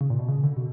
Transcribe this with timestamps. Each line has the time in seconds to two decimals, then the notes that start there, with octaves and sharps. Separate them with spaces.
0.01 C#3
0.10 A#2
0.19 B2
0.28 C#3
0.43 D3
0.57 B2